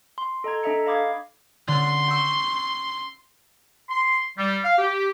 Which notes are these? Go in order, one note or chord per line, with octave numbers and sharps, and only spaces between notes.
C6
A4 D#5 A#5 G#6
D4 A4 D#5 E5 A#5 C#7
D#5 F5 B5 D6 D#6 G#6
D3 C#4 D4 C6
G5 C#6 E6
C6
G3
F5
G4